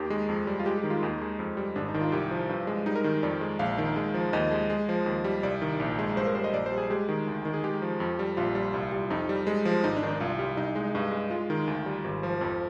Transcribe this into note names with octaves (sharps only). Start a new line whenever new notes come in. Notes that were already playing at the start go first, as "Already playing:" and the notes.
Already playing: D#2 D#3 G4
G#3
F2
G3
F4
G#3 G4
G4
D#3
F4
D#2 D#4
G#3
F2
G3
G#1 D4
D#4
D#3
F4
C2 G4
F3
G2
G#3
G3 D#4
A#4
D#3
F2 D5
G#3
A#1 F5
D#3
G#3
F3
D#2 D#5
G#3
G#3
F3
D#2
G3
C2 D5
D#3
A#1
G#3
G2 C5
A#4
G3 C5
D#5
A#1 D5
C5
G3
G#4
G#3 G4
D#3
D2
D#3
G#4
G#3 G4
F3
F2
G3
A#1 F4
G3
C2
G3
F2 D#4
G3
G#3
F3
G#1 D#4
D4
D#3
D4
C2 F4
G3
C2 D#4
G#3
G2
G#3
G#3 F4
D#3
D2
G3
G#1
F3
F2